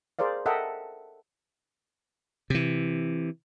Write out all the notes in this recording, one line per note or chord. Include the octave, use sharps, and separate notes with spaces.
G#4 A#4 C5 D5 F5
A4 A#4 D#5 E5 F#5 G5
C3 E3